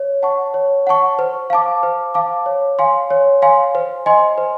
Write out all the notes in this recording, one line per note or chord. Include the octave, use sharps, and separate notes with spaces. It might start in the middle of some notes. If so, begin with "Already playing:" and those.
Already playing: C#5
F#5 A5 C#6
C#5
F#5 A5 C#6
C5
F5 A5 D6
C5
F5 A5 D6
C#5
F5 G#5 C6
C#5
F5 G#5 C6
C5
D#5 G#5 C6
C5